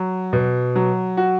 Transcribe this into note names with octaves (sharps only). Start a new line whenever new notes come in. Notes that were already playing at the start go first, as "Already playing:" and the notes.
Already playing: F#3
B2
F#3
F#4